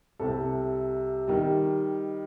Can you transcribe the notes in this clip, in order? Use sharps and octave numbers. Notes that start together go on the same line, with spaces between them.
C2 C3 G3 A4
D#3 G3